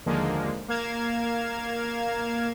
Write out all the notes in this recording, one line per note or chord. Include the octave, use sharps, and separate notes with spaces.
D#2 D3 F3 G#3 A#3
A#3 A#4 F5 G#6 E7